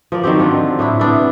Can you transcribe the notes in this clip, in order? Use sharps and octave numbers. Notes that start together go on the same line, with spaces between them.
F3 A#4 D5
D#3 F#3 C4 G4
D3 D4 F4
A2 D4 E4
C3 B3 D4 E4